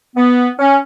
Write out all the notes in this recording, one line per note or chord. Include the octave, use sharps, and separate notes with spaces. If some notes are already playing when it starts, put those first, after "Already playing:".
B3
C#4